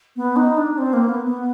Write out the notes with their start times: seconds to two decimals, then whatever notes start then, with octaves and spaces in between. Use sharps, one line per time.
0.16 B3
0.36 D#4
0.57 D4
0.78 C4
0.93 A#3
1.09 B3
1.25 B3